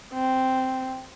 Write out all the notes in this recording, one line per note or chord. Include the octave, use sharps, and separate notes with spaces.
C4